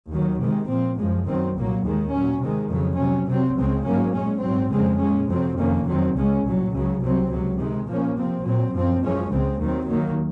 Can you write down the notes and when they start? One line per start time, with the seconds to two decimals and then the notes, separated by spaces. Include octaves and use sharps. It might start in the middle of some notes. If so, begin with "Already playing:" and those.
0.11 D#2 D#3 F#3
0.40 C3 D#3 G#3
0.69 A#2 F3 C4
0.98 F#2 F3 G#3
1.27 F#2 D#3 F#3 C4
1.56 C2 A#2 F#3 A#3
1.84 D#2 D#3 G#3
2.13 A#2 F#3 C#4
2.42 C3 D#3 G#3
2.70 F2 C#3 F#3
2.99 C3 F#3 C#4
3.28 C3 F#3 C4
3.57 C#2 C#3 G#3 C4
3.86 G#2 F#3 A#3 C#4
4.15 A#2 G#3 C#4
4.43 G#2 F#3 C4
4.72 F2 C#3 G#3 C4
5.00 A#2 G#3 C#4
5.29 F2 C3 F#3 C4
5.58 F2 C3 D#3 A#3 C#4
5.87 F2 D#3 F#3 C4
6.16 C#2 C#3 G#3 C#4
6.44 C2 A#2 F#3
6.73 C#2 C#3 F#3
7.02 C2 C3 F#3 C4
7.31 C#2 C3 F#3
7.59 C3 D#3 G#3
7.88 A#2 F3 A#3 C#4
8.17 C3 F3 C4
8.45 A#2 F#3 C4
8.75 F#2 F3 C4
9.03 F#2 F3 G#3 C#4
9.32 C#2 C#3 G#3 C4
9.61 D#2 D#3 F#3 C4
9.89 D#2 D#3 F#3 A#3